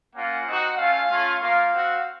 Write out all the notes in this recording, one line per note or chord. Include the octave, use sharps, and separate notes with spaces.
A#3 C#4 F4 F#5
C4 D#4 F#4
A3 C#4 F4 F5
A3 C#4 F4
A#3 F4 F5
C4 F#4